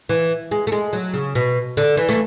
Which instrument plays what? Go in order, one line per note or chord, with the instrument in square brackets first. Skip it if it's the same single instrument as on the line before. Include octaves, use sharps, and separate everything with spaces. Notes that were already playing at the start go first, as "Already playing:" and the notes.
[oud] E3
G#3
A3
G#3
F#3
C#3
B2
D3
E3
A3